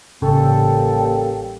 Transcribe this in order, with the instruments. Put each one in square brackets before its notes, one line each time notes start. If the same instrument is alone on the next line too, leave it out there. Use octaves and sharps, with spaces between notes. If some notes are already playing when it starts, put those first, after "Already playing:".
[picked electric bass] A1 C#3 [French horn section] G3 A#3 C#4 [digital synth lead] A4 [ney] G5